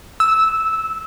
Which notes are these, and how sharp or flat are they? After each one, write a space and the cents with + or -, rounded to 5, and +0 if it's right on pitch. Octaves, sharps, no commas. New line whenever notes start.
E6 -10